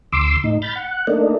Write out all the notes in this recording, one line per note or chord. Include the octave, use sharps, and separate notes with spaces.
D2 C6 D6 E6
A2 D#4
B5 F6 G6 A6
F#5
A3 A#3 D4 D#4